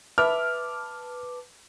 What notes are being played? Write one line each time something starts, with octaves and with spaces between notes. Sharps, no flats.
B4 E5 A5 D6 F6